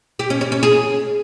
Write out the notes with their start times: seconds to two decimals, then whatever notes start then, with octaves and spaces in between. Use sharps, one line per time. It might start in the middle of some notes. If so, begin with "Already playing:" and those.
0.19 G4
0.30 C#4
0.41 C#4
0.52 C#4
0.63 G#4